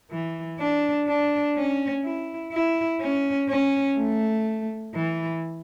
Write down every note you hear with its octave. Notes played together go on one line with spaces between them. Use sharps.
E3
D4
D4
C#4
E4
E4
C#4
C#4
A3
E3